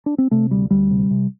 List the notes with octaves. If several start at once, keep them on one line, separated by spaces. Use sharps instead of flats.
D4
C4
C3 A3
D2 G3
D2 G3
C3
C3